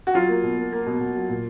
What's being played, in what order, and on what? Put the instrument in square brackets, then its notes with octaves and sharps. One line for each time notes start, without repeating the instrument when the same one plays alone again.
[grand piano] F#4
F#3 F4
A#3
B2
A#3
A#3
B2
B2
F#3
A#2